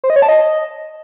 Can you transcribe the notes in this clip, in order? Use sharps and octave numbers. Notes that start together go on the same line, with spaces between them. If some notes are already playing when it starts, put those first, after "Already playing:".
C5
D#5
C#5
A5
D#5